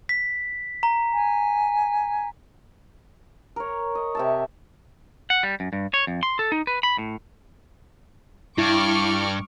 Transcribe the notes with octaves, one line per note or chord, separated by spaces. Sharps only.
B6
A#5
G#5
A#4 C#5
D#5
C3 E5 A5
F#5
G3
F#2
G2
C#5
F2
C6
A4
D#4
B4
B5
A2
G2 E4 C#6 D6 F6